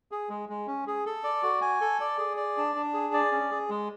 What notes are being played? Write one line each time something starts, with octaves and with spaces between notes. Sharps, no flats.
G#4
G#3
G#3
C#4
G#4
A4
D5
F#4
G#5
A4
D5
G#4
D5
D4
D4
G#4
D5
C#4
G#4
G#3